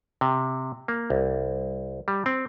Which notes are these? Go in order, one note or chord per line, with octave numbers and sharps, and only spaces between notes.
C3
A#3
C2
G3
C4